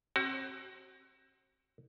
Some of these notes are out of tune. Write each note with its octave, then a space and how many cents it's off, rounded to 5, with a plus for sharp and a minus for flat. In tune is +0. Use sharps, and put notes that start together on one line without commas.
C4 +40 F#4 +30